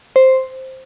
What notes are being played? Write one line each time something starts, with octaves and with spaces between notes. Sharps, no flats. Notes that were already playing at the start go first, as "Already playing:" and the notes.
C5